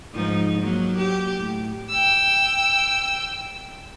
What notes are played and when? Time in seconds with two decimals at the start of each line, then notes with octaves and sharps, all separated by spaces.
0.13 G#2 F3 D#4
0.62 F#3 A#3
0.97 G4
1.37 A2
1.90 G5 E6